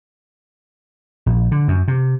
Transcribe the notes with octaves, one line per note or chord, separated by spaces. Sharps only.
A#1
D3
F#2
C3